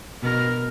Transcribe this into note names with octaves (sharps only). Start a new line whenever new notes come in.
B2 A#4